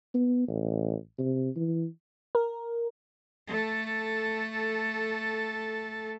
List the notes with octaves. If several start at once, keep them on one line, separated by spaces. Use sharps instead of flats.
B3
A1
C3
E3
A#4
A3 A4